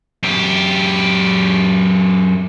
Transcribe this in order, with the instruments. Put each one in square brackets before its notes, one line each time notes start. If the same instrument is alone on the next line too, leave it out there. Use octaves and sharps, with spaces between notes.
[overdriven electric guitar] F#2 G4